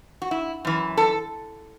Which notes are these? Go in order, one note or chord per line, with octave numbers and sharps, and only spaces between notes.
F#4
E4
F#2 E3
A4